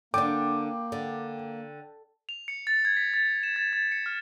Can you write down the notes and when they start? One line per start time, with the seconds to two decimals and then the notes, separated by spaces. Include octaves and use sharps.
0.14 D3 A#3 D4 G5 D6
0.92 D3
2.29 F7
2.48 C#7
2.67 A6
2.85 G#6
2.97 B6
3.14 A6
3.43 E7
3.56 A6
3.73 A6
3.92 C#7
4.06 F6